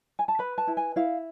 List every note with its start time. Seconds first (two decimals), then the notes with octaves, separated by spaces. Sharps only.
0.19 G#5
0.28 A5
0.39 B4 B5
0.58 A5
0.67 E4
0.77 G#5
0.96 E4 F5